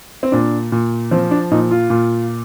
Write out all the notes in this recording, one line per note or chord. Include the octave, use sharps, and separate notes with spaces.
C4
A#2 D4
A#2
F3 C4
D4
A#2 D#4
F4
A#2